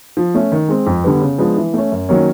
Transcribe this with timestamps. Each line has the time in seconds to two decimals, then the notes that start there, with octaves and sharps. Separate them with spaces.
0.17 F3
0.35 A3 C#4
0.52 D#3
0.69 G#3 C4
0.86 F2
1.04 D3 G3 B3
1.22 C#3
1.38 F3 G#3 B3 D4
1.57 E3
1.74 A3 C#4
1.91 F#2
2.09 D#3 F#3 A#3 C#4